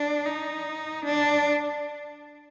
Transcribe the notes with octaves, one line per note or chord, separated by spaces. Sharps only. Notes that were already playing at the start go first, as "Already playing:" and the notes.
Already playing: D4
D#4
D4